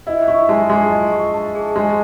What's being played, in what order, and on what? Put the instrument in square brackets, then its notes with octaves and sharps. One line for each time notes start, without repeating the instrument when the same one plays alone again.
[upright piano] E4 [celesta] D#5
[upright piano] E4 [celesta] C#6
[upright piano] G#3 [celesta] A5
[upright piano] G#3 [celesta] G#4
[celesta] D#5
C#6
A5
G#4
[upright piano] G#3 [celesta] D#5